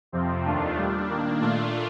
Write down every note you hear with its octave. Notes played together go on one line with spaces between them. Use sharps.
F2 C3 F3 C4
D#2 D#3 A3 D4 F4
A#2 G3 D4
D#3 A#3 D4
A#2 A3 D4 F4